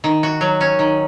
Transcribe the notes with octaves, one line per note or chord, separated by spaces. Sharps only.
D#3
F#4
F#3
C#4
D#3